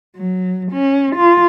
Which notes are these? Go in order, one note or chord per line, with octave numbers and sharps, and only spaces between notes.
F#3
C#4
F4